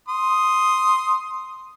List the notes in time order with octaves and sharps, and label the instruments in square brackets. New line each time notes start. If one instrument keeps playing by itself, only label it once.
[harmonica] C6 D#6